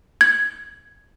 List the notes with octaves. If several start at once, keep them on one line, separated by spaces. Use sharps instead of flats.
G#6